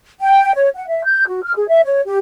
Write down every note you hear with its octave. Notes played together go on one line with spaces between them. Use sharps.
G5
C#5
F#5
E5
G6
F#4
F6
G#4
E5
C#5
G4